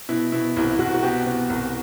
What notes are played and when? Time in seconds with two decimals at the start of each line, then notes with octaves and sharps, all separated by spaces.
0.09 B2 E4
0.32 B2 E4
0.56 C2 E4
0.71 E4
0.79 C2 F#4
0.94 F#4
1.03 B2 G4
1.26 B2
1.50 C2